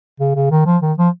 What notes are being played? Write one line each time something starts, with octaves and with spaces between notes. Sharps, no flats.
C#3
C#3
D#3
F3
D#3
F3